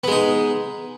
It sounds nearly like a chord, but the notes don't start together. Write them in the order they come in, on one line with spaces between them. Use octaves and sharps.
B3 G#3 D#4